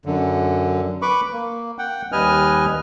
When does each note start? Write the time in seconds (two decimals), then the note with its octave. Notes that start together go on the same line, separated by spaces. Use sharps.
0.06 F#2 D3
1.02 B4 B5 C#6 D6
1.33 A#3
1.79 F#5 G5
2.12 D#2 G3 B4 D#5 G#5 F6